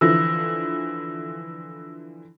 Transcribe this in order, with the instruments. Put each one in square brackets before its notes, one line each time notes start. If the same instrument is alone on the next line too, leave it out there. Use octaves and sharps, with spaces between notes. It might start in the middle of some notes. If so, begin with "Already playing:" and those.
[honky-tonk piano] D3 E3 F3 [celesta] E6 A#6